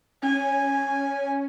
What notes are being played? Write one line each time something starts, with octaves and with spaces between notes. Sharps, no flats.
C#4 G#5